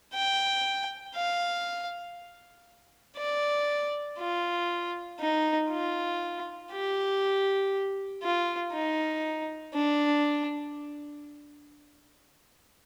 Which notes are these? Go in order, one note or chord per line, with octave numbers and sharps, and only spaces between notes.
G5
F5
D5
F4
D#4
F4
G4
F4
D#4
D4